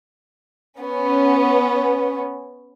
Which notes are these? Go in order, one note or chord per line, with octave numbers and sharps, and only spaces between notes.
B3 C#4